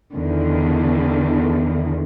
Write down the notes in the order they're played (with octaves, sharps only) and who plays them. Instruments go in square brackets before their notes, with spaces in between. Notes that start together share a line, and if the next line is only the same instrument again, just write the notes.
[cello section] E2 D3 D#3